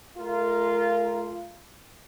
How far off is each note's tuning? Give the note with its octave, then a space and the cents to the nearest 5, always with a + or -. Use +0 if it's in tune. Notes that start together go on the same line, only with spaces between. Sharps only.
A3 -35 F4 -15 A#4 +0